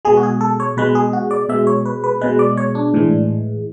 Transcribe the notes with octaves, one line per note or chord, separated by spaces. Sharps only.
B2 G#3 G#4
F#4
G#4
A4
C#5
B2 G#3 B4
G#4
F#4
D5
B2 G#3 E5
C#5
B4
B4
B2 G#3 B4
D5
C#5
D4
A2 E3 G#3